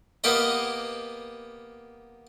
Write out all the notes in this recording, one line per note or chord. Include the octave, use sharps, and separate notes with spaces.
A#3 B3 G4 A#4 D#5